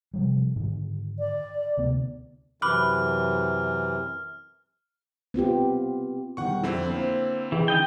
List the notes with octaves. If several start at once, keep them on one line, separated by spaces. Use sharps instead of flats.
C3 F3 G3
G#2 D3 D#3
D5
D2 C3 B3
F#2 C3 E3 B5 D6 F6 F#6
B3 C4 F4 G4
E1 D#3 G3 F#5 C#6
F2 D3 C4 E4
A#3 C5
E3 G#4 D#5 G5
D#3 D#5 G5